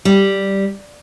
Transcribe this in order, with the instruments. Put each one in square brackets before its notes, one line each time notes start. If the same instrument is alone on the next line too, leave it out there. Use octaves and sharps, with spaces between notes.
[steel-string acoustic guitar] G3